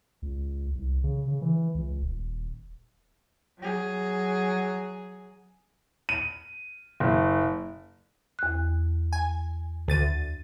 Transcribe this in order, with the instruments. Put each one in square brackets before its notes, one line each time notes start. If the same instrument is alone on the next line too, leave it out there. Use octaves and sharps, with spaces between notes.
[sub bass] C#2
C2
C#3
C#3
E3
C#2
D#1
[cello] F#3 G#4
[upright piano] D#7
F#1
[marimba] E2 F#6
[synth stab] G#5
D2 A6 D#7